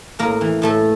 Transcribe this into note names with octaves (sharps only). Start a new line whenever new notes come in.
A2 A#3 A#4
E3
A2 A3 A4